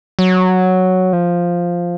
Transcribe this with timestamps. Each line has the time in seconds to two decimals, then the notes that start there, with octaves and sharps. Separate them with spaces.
0.19 F#3
1.13 F3